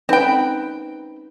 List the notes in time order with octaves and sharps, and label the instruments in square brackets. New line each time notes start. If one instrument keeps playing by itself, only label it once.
[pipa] C4 G5 [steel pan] C#4 D#4 B4